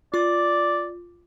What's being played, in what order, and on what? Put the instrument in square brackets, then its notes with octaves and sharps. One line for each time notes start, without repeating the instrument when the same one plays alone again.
[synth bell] F4 D6 [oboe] D5